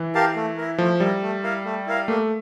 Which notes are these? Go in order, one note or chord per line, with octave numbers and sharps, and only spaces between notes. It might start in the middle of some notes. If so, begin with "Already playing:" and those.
Already playing: E3
G4 A#4 F5 A5
A3
E4 A#4
F3 A3
G3 E4 A#4
A3
E4 A#4 F5
A3
E4 A#4 F5
A3 A#3